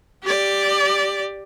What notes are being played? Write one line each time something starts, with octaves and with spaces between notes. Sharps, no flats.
G4 D5